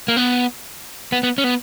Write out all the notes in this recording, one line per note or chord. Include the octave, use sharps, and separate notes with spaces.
A#3
B3
B3
B3
C#4
B3